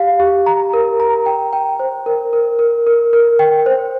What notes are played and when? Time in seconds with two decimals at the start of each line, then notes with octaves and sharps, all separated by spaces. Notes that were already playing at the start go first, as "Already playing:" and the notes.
Already playing: G4 F5
0.20 G4
0.46 A#5
0.74 A#4
1.00 A#5
1.26 G5
1.53 G5
1.80 C5
2.06 A#4
2.33 A#4
2.59 A#4
2.87 A#4
3.13 A#4
3.39 G5
3.66 C5